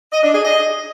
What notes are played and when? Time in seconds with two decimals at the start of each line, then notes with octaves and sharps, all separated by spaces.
0.12 D#5
0.23 D4
0.33 G#4
0.44 D#5